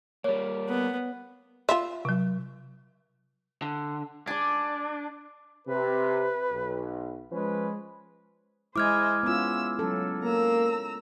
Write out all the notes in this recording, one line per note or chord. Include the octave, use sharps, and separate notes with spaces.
G3 A#3 C#5
B3
F4 E5 C6
C3 F#3
D3
D4 D5 G#5
C3 B4
B1
F3 G#3 C#4 B4
G#3 E4 C5 D#5 G#5 D6 F6 G#6
B3 C#4 F4 E6
F#3 C#4 A4
A#3 A#5 E6